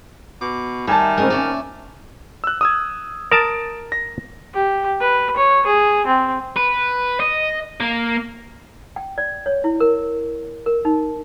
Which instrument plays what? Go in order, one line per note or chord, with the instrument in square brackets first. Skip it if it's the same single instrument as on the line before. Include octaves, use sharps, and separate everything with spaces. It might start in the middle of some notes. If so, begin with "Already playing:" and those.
[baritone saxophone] B2 [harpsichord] D6
[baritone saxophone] D#3 [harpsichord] G3 [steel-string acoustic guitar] E5 [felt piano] G#5 A5
[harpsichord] C2 A#4 [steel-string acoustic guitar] G#3 C#4 D#5
[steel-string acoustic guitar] A#2 C#4 E5 [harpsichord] D5
[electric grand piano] E6 F#6
D#6 E6 G#6
[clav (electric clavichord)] A#4 A5 [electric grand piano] D#6 A6 D7
[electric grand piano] A#6
[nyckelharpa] G4
B4
C#5
G#4
C4
[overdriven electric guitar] B4
D#5
A#3
[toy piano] G5
D5
C#5
E4
A#4
A#4
D#4